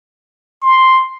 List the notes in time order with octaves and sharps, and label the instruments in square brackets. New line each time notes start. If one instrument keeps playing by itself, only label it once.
[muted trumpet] C6